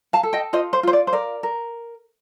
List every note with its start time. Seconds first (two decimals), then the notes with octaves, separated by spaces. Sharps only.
0.13 F5 A5
0.23 A4
0.33 D#5 G5
0.53 F4 C5 D#5
0.73 C5
0.83 F4 C5
0.93 D5
1.07 C5
1.13 A#4 D5
1.43 A#4